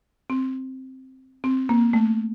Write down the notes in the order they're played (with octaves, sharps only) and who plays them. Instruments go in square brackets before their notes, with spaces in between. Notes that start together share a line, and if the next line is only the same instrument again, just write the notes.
[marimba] C4
C4
A#3
A3